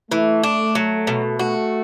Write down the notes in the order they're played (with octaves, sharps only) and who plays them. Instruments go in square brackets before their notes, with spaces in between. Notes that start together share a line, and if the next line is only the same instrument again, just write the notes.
[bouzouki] E3 [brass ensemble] A3
[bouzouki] D4
F#3
B2
[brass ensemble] A3 [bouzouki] F#4